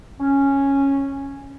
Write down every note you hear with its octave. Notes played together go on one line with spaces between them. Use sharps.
C#4